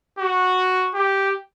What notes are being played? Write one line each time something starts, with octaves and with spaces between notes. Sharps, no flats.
F#4
G4